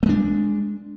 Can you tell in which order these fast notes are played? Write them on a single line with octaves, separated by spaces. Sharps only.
A3 G#3 D4